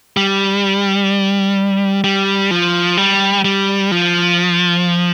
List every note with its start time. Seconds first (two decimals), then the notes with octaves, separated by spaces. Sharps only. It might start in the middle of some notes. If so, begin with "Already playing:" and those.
0.17 G3
2.04 G3
2.51 F3
2.97 G3
3.45 G3
3.91 F3